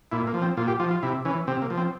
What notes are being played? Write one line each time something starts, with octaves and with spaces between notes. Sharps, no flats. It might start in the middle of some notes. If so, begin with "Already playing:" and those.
A#2 E4
A#3
F3
C4
A#2 F4
G4
F3 F4
F4
C3 E4
E3 C#4
C3 C4
A#3
F3
C4